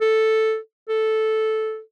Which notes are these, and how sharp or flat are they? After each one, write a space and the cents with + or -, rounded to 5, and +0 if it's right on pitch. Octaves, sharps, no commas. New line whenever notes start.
A4 +0
A4 -5